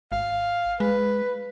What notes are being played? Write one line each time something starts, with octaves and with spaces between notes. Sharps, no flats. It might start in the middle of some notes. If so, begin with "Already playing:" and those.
G#1 F5
G#3 B4